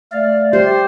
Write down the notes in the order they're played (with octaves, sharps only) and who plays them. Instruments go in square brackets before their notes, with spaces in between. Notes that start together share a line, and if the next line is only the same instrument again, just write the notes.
[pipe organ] A3 D5 [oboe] F5
[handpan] G4 [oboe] C5